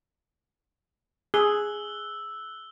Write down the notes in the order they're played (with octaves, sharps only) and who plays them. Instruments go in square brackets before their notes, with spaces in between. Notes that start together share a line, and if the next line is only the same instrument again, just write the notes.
[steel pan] G#4 [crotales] E6 F#6 G7